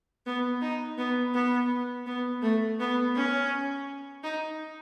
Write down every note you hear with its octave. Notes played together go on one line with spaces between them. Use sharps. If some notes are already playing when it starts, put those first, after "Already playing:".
B3
D#4
B3
B3
B3
A3
B3
C#4
D#4